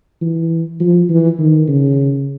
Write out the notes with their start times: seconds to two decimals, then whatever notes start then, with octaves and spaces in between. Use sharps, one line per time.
0.21 E3
0.80 F3
1.09 E3
1.39 D#3
1.68 C#3